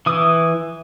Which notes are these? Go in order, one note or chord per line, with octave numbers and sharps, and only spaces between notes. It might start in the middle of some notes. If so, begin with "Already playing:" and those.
E3 D#6